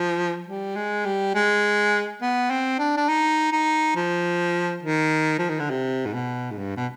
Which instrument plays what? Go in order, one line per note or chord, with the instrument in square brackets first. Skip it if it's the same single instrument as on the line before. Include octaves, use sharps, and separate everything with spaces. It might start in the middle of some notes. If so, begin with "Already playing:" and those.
Already playing: [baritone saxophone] F3
G3
G#3
G3
G#3
B3
C4
D4
D4
D#4
D#4
F3
D#3
F3
D#3
D3
C3
G#2
B2
G#2
G2
B2